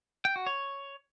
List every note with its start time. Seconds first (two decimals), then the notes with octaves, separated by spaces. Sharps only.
0.25 G5
0.36 F#4
0.47 C#5